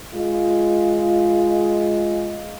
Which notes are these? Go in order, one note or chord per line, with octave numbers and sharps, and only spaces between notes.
G#3 F4